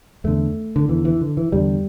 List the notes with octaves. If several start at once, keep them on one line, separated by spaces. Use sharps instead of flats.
E2 D3 A3
D3
E2 D3 E3
E3
D3
E3
E2 D3 G3